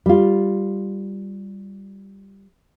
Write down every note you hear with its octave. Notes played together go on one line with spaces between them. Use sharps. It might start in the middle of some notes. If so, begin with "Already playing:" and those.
G3 F4